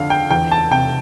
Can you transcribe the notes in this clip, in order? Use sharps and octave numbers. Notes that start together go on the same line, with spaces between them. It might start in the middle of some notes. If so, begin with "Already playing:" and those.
Already playing: F2 D3 F5
G5
E2 G5
A5
C3 G5